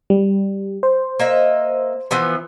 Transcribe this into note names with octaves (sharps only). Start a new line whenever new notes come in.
G3
C5
A#3 D#5 E5
E3 F3 B3